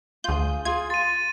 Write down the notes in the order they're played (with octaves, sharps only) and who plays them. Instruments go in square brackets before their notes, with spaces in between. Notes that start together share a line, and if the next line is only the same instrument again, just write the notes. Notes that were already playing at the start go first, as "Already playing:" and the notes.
[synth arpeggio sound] D2 G6 [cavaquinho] F4 G#4
[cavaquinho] F4 G#4 [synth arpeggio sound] G#6
[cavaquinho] C6 [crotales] A6 D#7